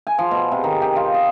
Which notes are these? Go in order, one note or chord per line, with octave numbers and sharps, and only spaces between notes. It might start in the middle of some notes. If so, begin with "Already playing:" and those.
G#5
F3
B2
C3
D#3
G4
F4
D#5